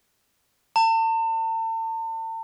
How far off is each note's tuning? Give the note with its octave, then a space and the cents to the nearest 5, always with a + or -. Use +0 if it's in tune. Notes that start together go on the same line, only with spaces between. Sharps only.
A5 +40